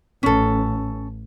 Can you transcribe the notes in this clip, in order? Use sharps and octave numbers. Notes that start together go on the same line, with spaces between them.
A1 C#4 A4